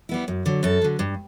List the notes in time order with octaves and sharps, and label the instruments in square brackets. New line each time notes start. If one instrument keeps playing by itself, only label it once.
[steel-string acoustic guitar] G3 B3 E4
F#2
D3 F#3
F#2 A4
D3 F#3
G2